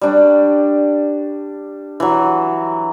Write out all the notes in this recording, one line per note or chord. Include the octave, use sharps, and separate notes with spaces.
G3 D4 C#6
E3 F#3